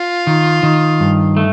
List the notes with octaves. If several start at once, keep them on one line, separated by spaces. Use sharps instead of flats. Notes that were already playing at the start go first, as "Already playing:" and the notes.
Already playing: F4
D#3
D#3
G2
A3